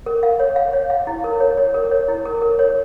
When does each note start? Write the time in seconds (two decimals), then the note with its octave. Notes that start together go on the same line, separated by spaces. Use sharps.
0.06 A#4
0.23 F5
0.40 C#5
0.56 F5
0.73 C#5
0.90 F5
1.07 E4
1.24 A#4
1.40 C#5
1.57 C#5
1.74 A#4
1.91 C#5
2.08 E4
2.25 A#4
2.42 A#4
2.59 C#5